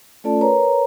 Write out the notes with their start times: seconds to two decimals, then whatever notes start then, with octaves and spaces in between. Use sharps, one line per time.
0.24 A3 C#4 F4 A4 D5 A5
0.41 A#4 B4 C#5 A#5